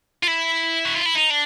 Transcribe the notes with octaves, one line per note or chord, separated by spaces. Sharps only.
F4
E4
F#4
F4
E4
D#4
D4